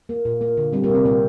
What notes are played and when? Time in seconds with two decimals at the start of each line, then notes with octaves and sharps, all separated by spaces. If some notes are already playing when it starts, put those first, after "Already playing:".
0.09 A#3
0.25 A#2
0.41 A#3
0.57 D3
0.73 G3 C4
0.84 A#3
0.90 C3
0.95 C4
1.05 A#2 A#3